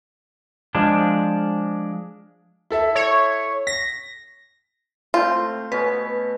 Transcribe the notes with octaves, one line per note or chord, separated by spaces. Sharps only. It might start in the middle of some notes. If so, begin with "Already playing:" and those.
F3 G#3 D4
E4 A4 E5
C#5
A#6 B6
A3 C4 F4
B2 B3 C#4 B4